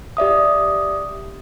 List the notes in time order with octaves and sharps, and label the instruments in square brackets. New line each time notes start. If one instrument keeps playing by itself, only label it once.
[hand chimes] G4 D5 E5 D#6